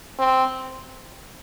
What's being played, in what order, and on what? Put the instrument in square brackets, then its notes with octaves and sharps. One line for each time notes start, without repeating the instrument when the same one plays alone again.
[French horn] C4